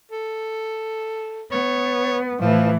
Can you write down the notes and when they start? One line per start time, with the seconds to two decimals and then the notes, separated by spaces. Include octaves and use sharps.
0.12 A4
1.52 B3 C#5
2.41 A2 E3 F3